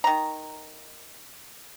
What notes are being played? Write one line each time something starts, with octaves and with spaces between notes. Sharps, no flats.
D#3 A#5